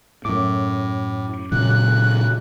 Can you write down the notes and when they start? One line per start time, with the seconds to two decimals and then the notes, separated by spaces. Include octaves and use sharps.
0.25 F#2 A2 D6
1.51 A#2 C#3 F#3 F#6